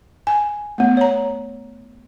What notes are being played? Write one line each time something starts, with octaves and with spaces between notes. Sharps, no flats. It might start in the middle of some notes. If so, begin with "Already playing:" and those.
G#5
A3 B3
C#5 A#5